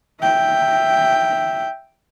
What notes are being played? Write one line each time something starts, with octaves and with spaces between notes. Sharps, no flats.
E5 G5